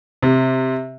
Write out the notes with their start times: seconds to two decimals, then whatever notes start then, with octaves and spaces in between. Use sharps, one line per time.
0.23 C3